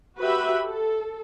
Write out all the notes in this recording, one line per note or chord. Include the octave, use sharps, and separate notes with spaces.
F#4 G4 B4 E5 B5
A4